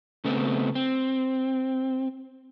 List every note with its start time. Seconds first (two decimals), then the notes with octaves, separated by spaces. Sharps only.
0.25 C#3 A3 B3 C4
0.75 C4